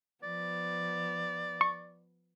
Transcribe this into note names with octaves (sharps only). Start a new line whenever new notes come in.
F3 B3 D5
C#6